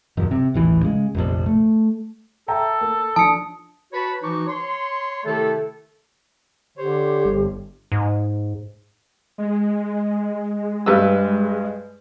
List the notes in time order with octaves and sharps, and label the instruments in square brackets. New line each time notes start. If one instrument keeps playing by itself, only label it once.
[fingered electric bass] D#1 F#2
C3
D#1 A1 E3
C#3 G#3
F1 A#1
A3
[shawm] A4 [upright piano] E5 G5 A#5
[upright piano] A#3
[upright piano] F3 D4 [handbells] A5 C#7 [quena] D#6
[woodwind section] F#4 B4 C#5 A5 B5
E3 F3 D#4 F#4 C#6 D6
C#5 C6
C3 D#3 A3 E4 A4
[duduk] D3 [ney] G4 [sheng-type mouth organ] C5 C#5
[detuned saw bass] G1
[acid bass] G#2
[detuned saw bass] G#3
[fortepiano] G2 B4 E6